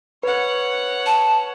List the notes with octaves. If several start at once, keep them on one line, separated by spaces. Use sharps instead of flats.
B4 C#5 F#5
A5